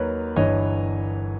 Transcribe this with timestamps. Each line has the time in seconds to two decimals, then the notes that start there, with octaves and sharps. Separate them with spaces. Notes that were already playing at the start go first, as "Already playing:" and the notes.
Already playing: D#2 D#3 F#3 A#4 B4 C#5
0.36 G1 G2 E3 C#5 D#5